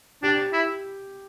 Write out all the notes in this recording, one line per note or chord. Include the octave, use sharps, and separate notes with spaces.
D4 G4
E4